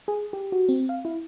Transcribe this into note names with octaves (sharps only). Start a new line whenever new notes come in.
G#4
G4
F#4
C4
F5
E4